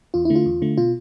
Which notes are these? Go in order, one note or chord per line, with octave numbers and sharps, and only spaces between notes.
E2 F4
E4
D3 A3
F4
E2
D3 A3
B2 F4